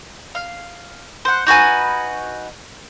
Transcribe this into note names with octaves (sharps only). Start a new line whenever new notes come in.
F5
C5 F#5
D#4 F#4 B4 G#5